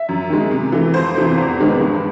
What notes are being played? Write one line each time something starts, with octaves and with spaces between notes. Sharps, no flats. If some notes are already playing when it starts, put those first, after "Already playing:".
Already playing: E5
F#2
D#3 G#3
C3
E3 A3
F2 C5
C3 E3 A3
E2
C3 D#3 G#3 B3
G2